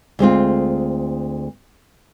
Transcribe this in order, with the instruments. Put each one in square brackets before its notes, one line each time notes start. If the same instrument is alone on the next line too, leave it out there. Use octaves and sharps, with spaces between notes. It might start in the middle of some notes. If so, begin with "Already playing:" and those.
[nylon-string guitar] D2 G#3 C4 F4